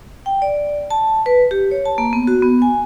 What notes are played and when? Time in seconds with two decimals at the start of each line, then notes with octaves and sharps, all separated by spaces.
0.26 G5
0.42 D5
0.91 A5
1.26 B4
1.51 G4
1.71 C#5
1.85 A5
1.98 A#3
2.13 B3
2.27 F#4
2.42 B3
2.62 G#5